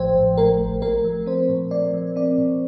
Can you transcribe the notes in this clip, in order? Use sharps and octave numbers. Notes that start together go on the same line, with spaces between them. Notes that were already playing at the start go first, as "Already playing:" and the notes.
Already playing: A1 A2 F3 A3 C5 G5
A2
A3 A#4
A1
A3 A#4
F3
C4 C5
A#2
A3 D5
F3
C4 D5
A#2